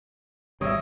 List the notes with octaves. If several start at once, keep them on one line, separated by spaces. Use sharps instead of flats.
G#1 B2 G3 C#5 D#5 E5